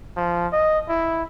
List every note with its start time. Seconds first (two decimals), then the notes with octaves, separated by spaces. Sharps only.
0.17 F3
0.53 D#5
0.89 E4